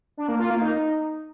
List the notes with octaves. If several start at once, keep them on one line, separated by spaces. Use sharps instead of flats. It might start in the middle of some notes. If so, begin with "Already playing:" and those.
D4
A#3
F4
A#3
D#4